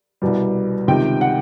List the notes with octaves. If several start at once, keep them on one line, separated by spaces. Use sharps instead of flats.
C2 B2 G3
C#2 C3 D#3 G5
F#5